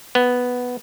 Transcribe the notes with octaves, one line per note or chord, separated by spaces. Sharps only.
B3